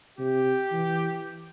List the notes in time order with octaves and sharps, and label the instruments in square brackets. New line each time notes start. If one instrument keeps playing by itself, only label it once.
[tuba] C3 [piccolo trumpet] G4
[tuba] E3